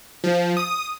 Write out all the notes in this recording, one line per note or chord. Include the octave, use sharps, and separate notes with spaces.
F3
D#6